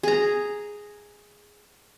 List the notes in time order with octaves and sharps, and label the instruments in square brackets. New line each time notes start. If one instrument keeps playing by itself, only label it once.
[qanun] G#4 A#5